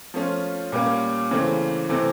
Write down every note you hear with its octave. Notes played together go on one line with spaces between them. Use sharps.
F3 A3 C#4 F4
A#2 G3 A#3 C#4
C#3 E3 A3 C4
C3 E3 A3 C4